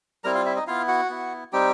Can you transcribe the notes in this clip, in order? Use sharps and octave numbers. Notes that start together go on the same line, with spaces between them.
G3 C4 E4 A#4 A#5
F4 F5
E4 E5
D#4 D#5
B3 E4 F4 F5
F#4 F#5
B3 E4
G3 C4 D#4 G4 G5